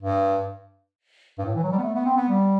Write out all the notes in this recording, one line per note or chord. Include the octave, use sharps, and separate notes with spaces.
G2
G2
A2
E3
F#3
G3
B3
A3
B3
C4
B3
G3